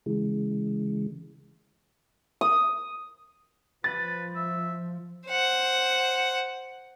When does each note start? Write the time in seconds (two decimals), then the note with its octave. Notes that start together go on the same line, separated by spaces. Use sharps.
0.06 C#3 E3 G#3
2.41 D#6
3.84 F3 B4 A6
4.35 E5
5.27 C5 F#5